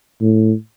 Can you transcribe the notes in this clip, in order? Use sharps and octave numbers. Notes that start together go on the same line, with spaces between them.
A2